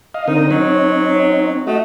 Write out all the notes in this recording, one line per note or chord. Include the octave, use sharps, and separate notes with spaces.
D#5 F5
D3 C4 D#4 A#4
F#3 C4 C#4 D#4
A3 F#4 D#5